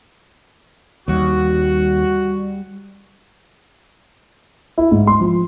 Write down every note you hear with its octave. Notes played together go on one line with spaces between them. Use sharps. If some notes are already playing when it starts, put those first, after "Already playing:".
D#2 G3 F#4
E4
G#2
C6
F3